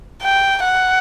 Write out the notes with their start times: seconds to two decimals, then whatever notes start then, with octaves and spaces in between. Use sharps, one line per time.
0.22 G5
0.64 F#5